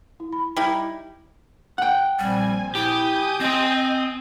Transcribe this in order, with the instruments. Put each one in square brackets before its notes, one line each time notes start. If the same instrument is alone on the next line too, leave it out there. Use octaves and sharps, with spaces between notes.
[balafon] E4
B5
[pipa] G3 D#4 E4 [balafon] G5
[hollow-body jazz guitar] F#5 G5
[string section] A#1 C4 G#5 [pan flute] G3
[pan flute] E4 [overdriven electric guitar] G4 [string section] G#5 D#6 G6
[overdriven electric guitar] C4 G5 [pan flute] D#5